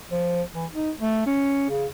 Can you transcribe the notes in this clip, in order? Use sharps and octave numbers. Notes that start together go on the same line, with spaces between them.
F3
E3
D#4
A3
C#4
C#3